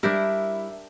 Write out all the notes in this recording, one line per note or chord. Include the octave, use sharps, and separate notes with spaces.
G3 D4 E4 G4 A#4